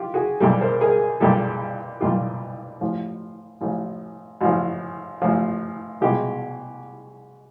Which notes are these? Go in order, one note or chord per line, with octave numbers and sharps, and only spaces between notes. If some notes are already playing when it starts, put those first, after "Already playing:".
Already playing: F4 G4
F#4 G#4
B1 A#2 G3 G4 A4
A#4 C5
G#4 A#4
B1 A#2 G3 G4 A4
B1 A#2 G3 F4 G4
A1 A2 F3
A1 A2 F3
A1 A2 F3 F#4
A1 A2 F3
C2 B2 G#3 F4 G4